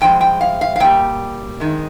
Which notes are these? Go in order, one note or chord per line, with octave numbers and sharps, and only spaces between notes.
G2 F3 G#3 G5
G5
F5
F5
F5
A#2 G3 G5
F2 D#3 G#3